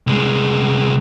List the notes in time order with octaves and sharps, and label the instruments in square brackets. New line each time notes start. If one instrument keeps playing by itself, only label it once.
[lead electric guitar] C2 G#3